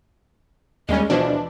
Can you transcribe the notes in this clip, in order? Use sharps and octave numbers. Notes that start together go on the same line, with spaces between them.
D#2 G3 G#3 C#4 D#5
B2 E3 F3 D4